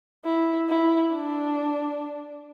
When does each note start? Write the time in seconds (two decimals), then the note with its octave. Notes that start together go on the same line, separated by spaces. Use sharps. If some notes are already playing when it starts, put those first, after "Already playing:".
0.25 E4
0.69 E4
1.13 D4